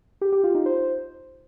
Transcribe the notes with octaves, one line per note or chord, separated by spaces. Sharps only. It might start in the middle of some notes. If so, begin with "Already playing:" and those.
G4
G4
F4
D#4
C5